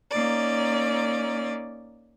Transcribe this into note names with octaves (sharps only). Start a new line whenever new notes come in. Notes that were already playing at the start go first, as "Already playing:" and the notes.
A#3 C#4 D#4 D5